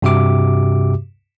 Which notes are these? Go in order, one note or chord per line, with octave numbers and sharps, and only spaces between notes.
G2 C3 F#4 G4 E5 D6